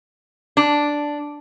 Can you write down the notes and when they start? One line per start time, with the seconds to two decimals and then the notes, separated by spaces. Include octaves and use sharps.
0.57 D4